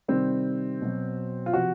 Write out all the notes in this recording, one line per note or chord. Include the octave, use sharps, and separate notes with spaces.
C3 D#3 G3 C4
B2 F#3
F4
C3 F3 F#4